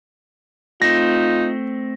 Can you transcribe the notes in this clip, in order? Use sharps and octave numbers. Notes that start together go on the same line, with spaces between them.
A3 C4 D#4 F4 A#6